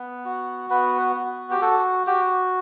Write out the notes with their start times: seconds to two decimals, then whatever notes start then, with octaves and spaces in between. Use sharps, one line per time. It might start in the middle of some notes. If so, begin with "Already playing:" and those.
Already playing: B3
0.25 F#4
0.70 B3 B4
1.16 F#4
1.51 G4
1.62 F#4 A4
2.07 F#4 G4